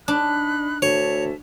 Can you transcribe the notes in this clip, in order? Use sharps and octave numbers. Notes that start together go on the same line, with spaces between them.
D4 D#4 B5 F#6
D2 C#5 E5 A5